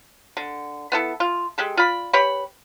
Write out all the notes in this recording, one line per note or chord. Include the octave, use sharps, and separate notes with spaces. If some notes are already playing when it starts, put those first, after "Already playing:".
D3
B3 E4 A4
F4
G#3 G4 A4
F4 D5 B5
G4 B4 C#5 B5